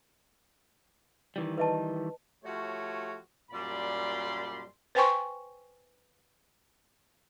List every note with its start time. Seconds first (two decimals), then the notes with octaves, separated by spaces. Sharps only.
1.36 D#3 E3 G3
1.58 B4 D#5 A5
2.43 F3 A3 F#4 G4 C#5
3.51 F#2 A#2 G3 D5 B5 C6
4.95 B4 C5 G5 G#5 C6 C#6